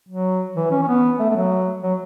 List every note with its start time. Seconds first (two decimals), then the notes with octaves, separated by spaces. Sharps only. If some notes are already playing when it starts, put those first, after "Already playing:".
0.09 F#3
0.56 E3
0.71 C#4
0.83 C#4
0.88 B3
1.19 A3
1.30 A3
1.36 F#3
1.83 F#3